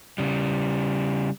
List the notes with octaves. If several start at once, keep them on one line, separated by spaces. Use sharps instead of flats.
C#3 G3